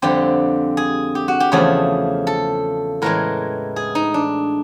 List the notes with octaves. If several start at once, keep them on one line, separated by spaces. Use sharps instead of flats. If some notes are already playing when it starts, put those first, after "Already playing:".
F2 D3 G3 C4 G4
G#4
G4
F#4
G4
E2 C#3 F3 A3 G#4
A4
A2 E3 G#3 A#4
G#4
D#4
D4